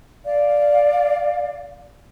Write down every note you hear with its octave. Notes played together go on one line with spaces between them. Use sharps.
D5 F5